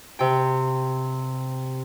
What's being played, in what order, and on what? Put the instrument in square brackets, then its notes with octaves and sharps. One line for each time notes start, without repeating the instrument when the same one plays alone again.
[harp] C3 G5